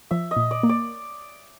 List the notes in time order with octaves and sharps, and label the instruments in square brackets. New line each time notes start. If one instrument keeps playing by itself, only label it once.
[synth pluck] F3 [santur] E5
[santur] D#5
[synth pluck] A#2
[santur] D5
[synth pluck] A#3
[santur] D5